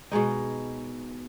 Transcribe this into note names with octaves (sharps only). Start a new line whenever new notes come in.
B2 G#3 D#4